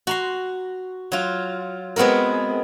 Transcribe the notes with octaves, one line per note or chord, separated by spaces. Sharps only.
F#4 A#5 C6
F#3 F4
G#3 B3 C4 F#4 A#4